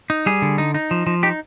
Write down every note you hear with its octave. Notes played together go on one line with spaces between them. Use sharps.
D#4
G3 G#4
D3
D#4
D#4
F3
F3
D#4 G4